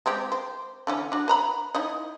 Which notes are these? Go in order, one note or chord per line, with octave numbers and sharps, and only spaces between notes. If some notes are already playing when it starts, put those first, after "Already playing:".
G#3 C4 G4
C5
D3 E3 C#4
D4 F#4
B4 A#5 B5
D#4 E4 D#5